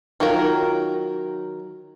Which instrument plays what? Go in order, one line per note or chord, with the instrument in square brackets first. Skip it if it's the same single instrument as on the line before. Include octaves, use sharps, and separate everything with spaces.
[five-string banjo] D#3 F#3 F4 A#4